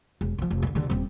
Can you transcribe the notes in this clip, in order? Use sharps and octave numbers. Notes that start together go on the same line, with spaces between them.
E1
D3 F3
F1
A2 D3
D#2 D3
D#1 C4